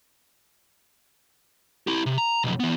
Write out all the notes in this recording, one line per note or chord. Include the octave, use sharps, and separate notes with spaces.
E4 G4
C3
A#5
B1 F2
E3 B3